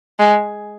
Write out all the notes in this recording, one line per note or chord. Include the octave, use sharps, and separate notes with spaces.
G#3